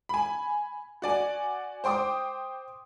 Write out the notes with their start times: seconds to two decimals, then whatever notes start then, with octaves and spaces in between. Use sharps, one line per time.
0.09 G#5 B5
1.02 F#4 D5 G#5
1.84 C5 G5 C6 D6 D#6